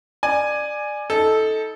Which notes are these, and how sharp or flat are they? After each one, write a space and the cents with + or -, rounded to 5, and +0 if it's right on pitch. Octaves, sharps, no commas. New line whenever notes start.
D5 +20 G#5 +0
D#4 +25 A4 -10